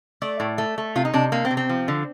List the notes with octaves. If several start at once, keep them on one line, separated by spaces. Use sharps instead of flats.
A3 D5
A2
A3
A3
C3 F4
D#4
C3 D4
C3 A#3
C4
C3
C4
F3
D3